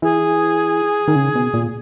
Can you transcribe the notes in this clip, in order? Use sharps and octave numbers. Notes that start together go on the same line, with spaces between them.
E3 G#4
D#3
C#3
B2
A#2